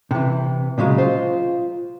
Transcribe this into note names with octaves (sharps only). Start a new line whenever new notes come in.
C3 E3
A#2 C#3 F#3 G#3
F4 C5